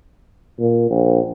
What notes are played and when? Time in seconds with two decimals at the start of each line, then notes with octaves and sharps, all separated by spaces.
0.59 A#2
0.90 A#1